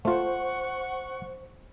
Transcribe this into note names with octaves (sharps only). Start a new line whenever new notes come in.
A3 F4 C5 F#5 C#6